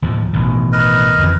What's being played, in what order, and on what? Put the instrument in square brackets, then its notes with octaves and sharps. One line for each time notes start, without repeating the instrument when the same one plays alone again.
[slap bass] D#2 A2 F3
A1 B2 D#3
[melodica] A#4 B4 D#5
[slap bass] F2 D3 E3